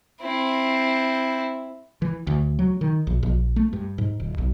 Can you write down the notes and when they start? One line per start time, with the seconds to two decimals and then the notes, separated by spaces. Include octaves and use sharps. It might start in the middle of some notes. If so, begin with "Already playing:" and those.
0.21 C4 E4
2.02 E3
2.27 D2
2.59 F#3
2.81 D#3
3.07 A#1
3.23 A#1
3.56 A3
3.73 G2
3.98 G#2
4.20 D1
4.38 B1